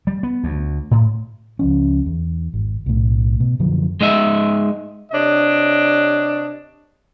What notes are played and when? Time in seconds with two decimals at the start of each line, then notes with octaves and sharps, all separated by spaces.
0.07 G3
0.23 B3
0.44 D2
0.91 A2
1.59 C#2 F3 C#4
2.06 E2
2.54 G#1
2.86 B1 A2
3.40 B2
3.60 F#2 D3 F3 F#3
4.01 G#3 D#4 D#5 E5
5.12 C3 D4 C#5 D#5